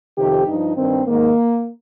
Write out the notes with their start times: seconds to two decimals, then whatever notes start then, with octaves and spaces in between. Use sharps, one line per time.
0.17 F2 C3 D#3 G4
0.47 G2 F3 D#4
0.77 G2 D#3 C4
1.07 G#2 D#3 A#3